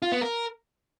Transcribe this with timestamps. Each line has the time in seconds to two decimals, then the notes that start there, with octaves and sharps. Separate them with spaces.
0.02 F4
0.12 B3
0.21 A#4